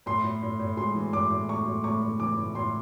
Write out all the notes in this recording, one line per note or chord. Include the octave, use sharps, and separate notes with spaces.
A2 C6
A2
A2
A2
G#3 C6
E3
A2 D6
A2
A2 C#6
A2
A2 C#6
A2
E3 D6
A2
A2 C6